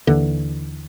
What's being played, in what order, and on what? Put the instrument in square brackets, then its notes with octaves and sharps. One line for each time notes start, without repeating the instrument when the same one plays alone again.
[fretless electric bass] D#2 D3 E3